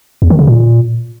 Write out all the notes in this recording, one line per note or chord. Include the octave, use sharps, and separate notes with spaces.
E2
D#3
C#3
A#2